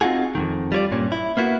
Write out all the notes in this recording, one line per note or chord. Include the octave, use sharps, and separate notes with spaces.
C4 D#4 F4 F#4 G#4
F2 G#2 D#3
G3 F4 C#5 D5
G2 A#2 C#4
E4
A#3 B3 E4 F#4